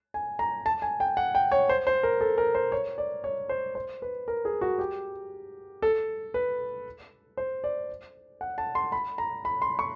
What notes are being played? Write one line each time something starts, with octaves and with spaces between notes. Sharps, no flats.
G#5
A#5
A5
G#5
G5
F#5
G5
C#5
C5
C5
A#4
A4
A#4
C5
C#5
D5
C#5
C5
C5
B4
A#4
G#4
F#4
G4
A4
B4
C5
D5
F#5
A5
C6
B5
A#5
B5
C6
C#6